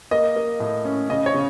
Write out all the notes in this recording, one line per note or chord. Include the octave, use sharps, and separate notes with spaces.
A#3 D#5
A#3
A2
C#4
C#3 D#5
C#5
C#3